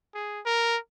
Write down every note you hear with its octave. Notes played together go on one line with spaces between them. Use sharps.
G#4
A#4